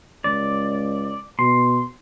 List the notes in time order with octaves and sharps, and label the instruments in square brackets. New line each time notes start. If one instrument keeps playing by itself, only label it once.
[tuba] C#2 [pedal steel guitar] D5
[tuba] B2 [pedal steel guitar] C6